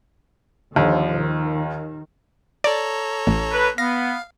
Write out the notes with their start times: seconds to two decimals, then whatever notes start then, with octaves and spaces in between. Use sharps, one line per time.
0.76 D#2 D3 F3
1.16 D#3
2.64 A4 C#5 D5 A#5
3.27 A1
3.53 B4
3.78 B3 F5 A#6